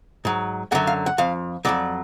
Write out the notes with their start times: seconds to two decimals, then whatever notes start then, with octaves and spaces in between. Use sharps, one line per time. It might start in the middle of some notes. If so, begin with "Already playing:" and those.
0.25 G#2 F#3
0.72 F#2 D3 F#3 F#5
0.87 F5
1.06 F#5
1.18 F2 F3 F5
1.65 F2 C#3 F#3 D5